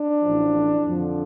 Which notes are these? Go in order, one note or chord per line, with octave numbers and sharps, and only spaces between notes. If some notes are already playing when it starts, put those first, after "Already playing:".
Already playing: D4
A1 A2 F3
F2 D3 F3